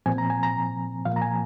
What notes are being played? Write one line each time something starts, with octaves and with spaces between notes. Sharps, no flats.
A#2 F3 C4 G#5
A#5
G#5
A#5
A#2 F3 A#3 F5
A#5
G#5